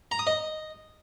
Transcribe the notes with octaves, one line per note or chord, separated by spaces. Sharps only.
A#5
D#6
D#5